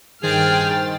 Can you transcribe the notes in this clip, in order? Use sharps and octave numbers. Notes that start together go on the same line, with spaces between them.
G2 D#3 G#4 C5 G5 F6 A6